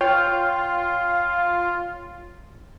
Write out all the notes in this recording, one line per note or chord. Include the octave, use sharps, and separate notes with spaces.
F4 C#5 G5 F6